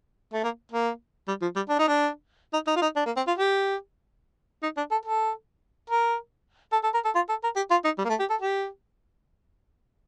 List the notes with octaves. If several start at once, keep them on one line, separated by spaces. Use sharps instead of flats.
A3
A#3
A#3
G3
F3
G3
D4
D#4
D4
D#4
D#4
F4
D#4
D4
A#3
C4
F4
G4
D#4
D4
A4
A4
A#4
A4
A4
A#4
A4
F4
A4
A#4
G4
F4
D#4
G3
A#3
A3
G4
A4
G4